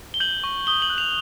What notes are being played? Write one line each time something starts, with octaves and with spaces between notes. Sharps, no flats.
G7
G6 F#7
C#6
D#6 G7
F#7
F#6
F7